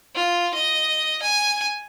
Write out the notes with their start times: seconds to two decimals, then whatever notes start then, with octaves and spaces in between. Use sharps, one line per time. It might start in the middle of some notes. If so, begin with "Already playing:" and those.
0.15 F4
0.54 D#5
1.22 G#5